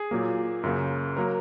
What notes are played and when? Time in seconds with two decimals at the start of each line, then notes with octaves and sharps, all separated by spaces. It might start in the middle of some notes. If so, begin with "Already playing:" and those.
Already playing: G#4
0.11 A#2 F#3 A#3
0.63 F#2 C#3 A#3
1.17 F#3 A#3 A#4